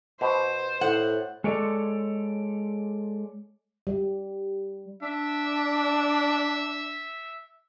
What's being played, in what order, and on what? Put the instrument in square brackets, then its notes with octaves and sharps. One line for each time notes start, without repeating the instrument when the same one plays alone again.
[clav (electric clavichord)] B2 [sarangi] C5
[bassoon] A2 [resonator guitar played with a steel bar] F#5
[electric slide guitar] G#3 A4 C#5 D5
[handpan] G3
[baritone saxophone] D4 [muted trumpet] E5